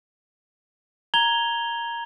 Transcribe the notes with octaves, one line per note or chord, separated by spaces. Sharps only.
A#5 G#6 F7 G7